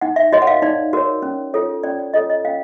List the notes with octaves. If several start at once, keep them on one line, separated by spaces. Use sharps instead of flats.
D#4 F#5
E5
F#4 A#4 C#5 D#5
F#5
F5
D#4 D5
F#4 A#4 C#5
C#4
F4 A4 C#5
C#4 D5
D5
F4 A4 C#5 D#5
D#5
C#4 F5